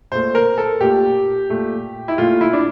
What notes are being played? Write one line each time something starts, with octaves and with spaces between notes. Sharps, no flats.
A#2 A3 C5
A#4
A4
A#2 A3 G4
A#2 A3
E4
A#2 A3 F4
E4
D4